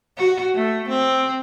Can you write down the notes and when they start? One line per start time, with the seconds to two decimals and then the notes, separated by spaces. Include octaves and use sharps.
0.17 F#4
0.55 A3
0.89 C4